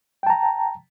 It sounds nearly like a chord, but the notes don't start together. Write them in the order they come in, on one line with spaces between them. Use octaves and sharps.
G5 A5 A#5